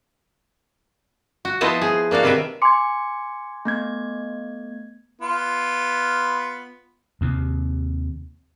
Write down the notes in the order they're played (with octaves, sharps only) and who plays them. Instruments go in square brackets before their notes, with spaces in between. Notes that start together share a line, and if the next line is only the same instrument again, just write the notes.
[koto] F#4
F3 B3 E4 C5 D#5 A5
G#4
A#3 D4 F#4 F5
C3 D#3 B4 E5 G5
[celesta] G#5 C6 D6 [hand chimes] G#6 C#7
[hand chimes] A3 B3 G#6
[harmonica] B3 F4
[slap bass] D#2 C3